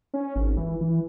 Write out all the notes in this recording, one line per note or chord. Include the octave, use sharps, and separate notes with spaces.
C#4
G#1
E3
E3